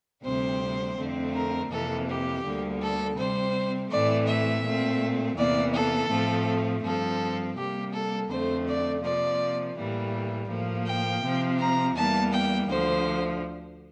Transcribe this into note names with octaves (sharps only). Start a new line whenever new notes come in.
D2 C3 G3 C4 C5
F2 D3 A3 C4
A#4
F2 C3 E3 A#3 A4
G4
D2 D3 G3 A#3
A4
C3 G3 C4 C5
A2 E3 A3 C4 D5
E5
A#2 A3 C4
E2 C3 E3 A#3 D5
A4
A2 F3 A3 C4
G2 F3 C4 A4
C3 G3 A#3 G4
A4
F2 D3 A3 C4 C5
D5
C3 F3 A#3 D5
A2 E3 G3 A#3
A2 F3 A#3
G5
C3 F3 C4
A#5
E2 E3 G3 A#3 A5
G5
D2 D3 F3 C5